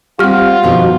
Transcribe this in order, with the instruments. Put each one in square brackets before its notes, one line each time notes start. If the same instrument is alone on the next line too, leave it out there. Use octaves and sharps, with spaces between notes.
[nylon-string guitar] G3 C4 [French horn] F4 [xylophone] G4 F6 [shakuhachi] F#5
[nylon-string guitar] F2 B2 D#3 [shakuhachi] F#4